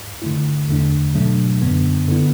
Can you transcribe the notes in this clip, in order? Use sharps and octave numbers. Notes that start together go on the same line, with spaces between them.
D3 A3 E4
E2 D3 A3 D4
B2 F#3 A3 D4
F#2 D3 B3 D4
D3 B3 E4